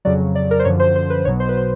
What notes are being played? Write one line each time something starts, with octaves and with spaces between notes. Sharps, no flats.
F2 C#3 F#3 D5
D5
A#4
C5
F#2 D3 F3 C#5
C5
C5
B4
B1 B2 F#3 C#5
C5
B4
C5